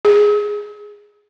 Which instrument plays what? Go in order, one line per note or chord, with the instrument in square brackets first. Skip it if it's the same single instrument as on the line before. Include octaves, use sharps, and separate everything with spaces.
[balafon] G#4